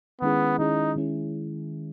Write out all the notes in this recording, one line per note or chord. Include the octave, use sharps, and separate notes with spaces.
D#3 G#3 B3 C#4 E4 G#4
D#3 G#3 C#4 D#4 E4 G#4
D#3 G#3 C#4 E4 G#4